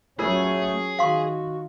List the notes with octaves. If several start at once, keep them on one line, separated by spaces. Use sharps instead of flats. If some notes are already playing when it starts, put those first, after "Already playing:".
F#3 A3 C#4 F4 G#4 A#4 D5
D#3 F#4 F5 C6